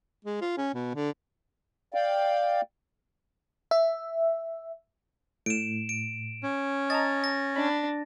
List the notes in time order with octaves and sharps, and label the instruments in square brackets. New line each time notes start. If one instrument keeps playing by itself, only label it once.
[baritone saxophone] G#3
F4
C#4
B2
D3
[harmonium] D5 F5 G5
[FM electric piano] E5
[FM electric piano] A2 [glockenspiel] D7 E7
[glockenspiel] D7
[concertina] C#4
[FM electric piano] D#5 A5 A#5 [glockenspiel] A6
[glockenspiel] A#6
[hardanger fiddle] D4 [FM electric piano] B5